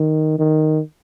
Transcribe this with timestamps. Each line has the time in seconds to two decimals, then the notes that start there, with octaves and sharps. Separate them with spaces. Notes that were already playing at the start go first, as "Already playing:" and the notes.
Already playing: D#3
0.39 D#3